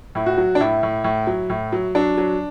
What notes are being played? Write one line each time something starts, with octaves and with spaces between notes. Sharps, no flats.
A2 E4
F#4
F#3
D4
A2 E4
A2
A2
F#3
A2
F#3
F#3 D4
F#3